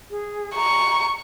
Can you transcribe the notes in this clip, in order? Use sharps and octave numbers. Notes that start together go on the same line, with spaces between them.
G#4
A#5 C#6